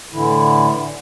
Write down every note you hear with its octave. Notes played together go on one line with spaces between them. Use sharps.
A2 D3 E3 E4